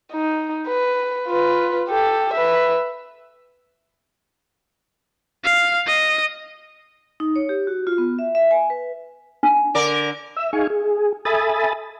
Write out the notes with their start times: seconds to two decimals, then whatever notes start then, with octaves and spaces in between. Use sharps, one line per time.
0.13 D#4
0.67 B4
1.28 F4 B4
1.89 G4 A4
2.34 B4 E5
5.44 F5
5.87 D#5
7.20 D#4
7.36 C#5
7.49 G4
7.67 F#4
7.87 F4
7.98 B3
8.19 E5
8.35 E5
8.51 G#5
8.70 B4
9.43 D4
9.74 D3 A#4 D5
10.36 E5 E6
10.53 D#4 G#4 F5 G#5 C#6
10.70 G#4
11.25 A4 E5 G#5 B5 D#6 A6